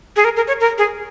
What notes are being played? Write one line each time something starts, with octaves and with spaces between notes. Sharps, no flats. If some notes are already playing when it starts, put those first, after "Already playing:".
G#4
A#4
A#4
C#5
A#4
G#4